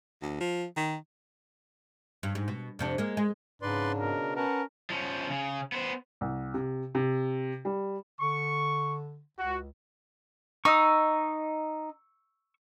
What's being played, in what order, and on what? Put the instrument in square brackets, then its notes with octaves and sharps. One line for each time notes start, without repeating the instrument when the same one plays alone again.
[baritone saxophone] D2
F3
D#3
[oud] G2
G#2
B2
F2 C3 D4
G#3 A#3
G#3
[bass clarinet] G#2 [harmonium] C#3 D4 [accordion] B4 D5 C6
[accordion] B2 [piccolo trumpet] A#4
[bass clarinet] C#4 [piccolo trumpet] A#4 [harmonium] B4 F#5 A5
[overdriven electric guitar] F3 C#4
C#3
B3 C5
[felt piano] C2
C3
C3
G3
[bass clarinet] D3 [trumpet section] C#6
[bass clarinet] C#2 [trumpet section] F#4
[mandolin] D#4 [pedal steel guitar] C#6 E6